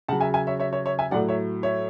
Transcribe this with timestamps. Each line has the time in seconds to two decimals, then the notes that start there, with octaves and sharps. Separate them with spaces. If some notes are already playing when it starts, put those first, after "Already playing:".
0.08 C#3 F#3 F#5 A5
0.21 E5 G#5
0.34 E5 G#5
0.47 C#5 E5
0.60 C#5 E5
0.72 C#5 E5
0.86 C#5 E5
0.99 E5 G#5
1.11 A2 F#3 D5 F#5
1.29 C#5 E5
1.63 C#5 E5